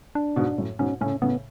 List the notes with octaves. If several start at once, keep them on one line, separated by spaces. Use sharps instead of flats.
D4
G#2 B2
F#2 A2
G#2 B2 C#4
A2 C#3 C#4
A2 C#3 B3